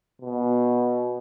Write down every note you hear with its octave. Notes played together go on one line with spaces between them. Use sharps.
B2